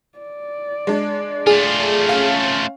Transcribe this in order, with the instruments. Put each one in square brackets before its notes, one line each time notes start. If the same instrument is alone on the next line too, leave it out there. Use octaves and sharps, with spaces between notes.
[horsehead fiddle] D5
[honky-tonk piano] G#3 D4
[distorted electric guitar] A3 F4 [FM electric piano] G#4
[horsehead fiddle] C#4 [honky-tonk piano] F5